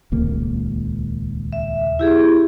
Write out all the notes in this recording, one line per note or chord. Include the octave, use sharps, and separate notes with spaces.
D#1 C#2 A#3
E5
E4 G4 G#4